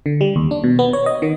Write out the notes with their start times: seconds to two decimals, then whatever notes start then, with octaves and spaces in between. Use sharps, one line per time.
0.06 D3
0.21 G3
0.36 D#2
0.51 D4
0.64 B2
0.79 B3
0.93 C#5
1.06 D#5
1.22 D#3